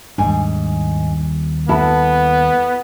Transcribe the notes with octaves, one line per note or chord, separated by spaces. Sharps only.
D#2 G#2 G3 D4 G#5
B3 E4 F#4 A4